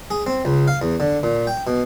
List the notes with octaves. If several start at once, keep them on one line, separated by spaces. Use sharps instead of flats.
G#4
C4
C#2
F5
E2
D3
A#2
G5
B2